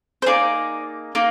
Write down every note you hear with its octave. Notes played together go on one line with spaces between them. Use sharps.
C5
A#3 D#4 G#4 D5
A#3 D#4